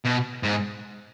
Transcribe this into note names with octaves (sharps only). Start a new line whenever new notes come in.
B2
G#2